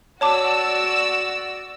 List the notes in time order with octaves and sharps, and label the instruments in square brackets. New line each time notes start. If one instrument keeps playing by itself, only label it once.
[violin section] F#4 D5 E6 [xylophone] C#5 A5 D6